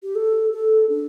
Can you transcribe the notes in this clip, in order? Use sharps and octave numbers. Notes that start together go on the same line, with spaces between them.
G4
A4
A4
D4